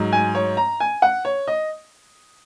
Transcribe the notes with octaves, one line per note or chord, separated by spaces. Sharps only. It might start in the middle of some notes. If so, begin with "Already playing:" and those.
Already playing: G#2 F#3
G#5
C#5
A#5
G#5
F#5
C#5
D#5